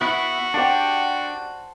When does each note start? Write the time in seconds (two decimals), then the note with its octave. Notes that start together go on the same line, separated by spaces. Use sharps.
0.01 B3 E4 F#4
0.54 D4 G4 C5 F#5 A5